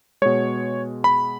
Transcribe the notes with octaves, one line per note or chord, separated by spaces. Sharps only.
B2 G#3 C#5
B5